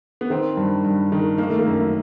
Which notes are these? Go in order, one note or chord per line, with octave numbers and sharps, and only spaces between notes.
B3
D#3 C4
G2
G2
D#3
D#3 A#3
A3
A#3
F#2